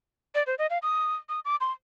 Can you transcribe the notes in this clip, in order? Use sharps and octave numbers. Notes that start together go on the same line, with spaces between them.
D5
C5
D#5
F5
D#6
D#6
D6
C6